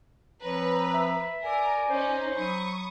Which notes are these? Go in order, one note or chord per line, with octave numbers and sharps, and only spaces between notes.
F3 C4 B4 C#5 A#5
E5
A#4 D5 G#5
C#4 D#4 C5
F#3 B5 C#6 D#6